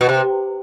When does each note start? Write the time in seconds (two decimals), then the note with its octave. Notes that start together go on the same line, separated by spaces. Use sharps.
0.01 B2
0.09 C3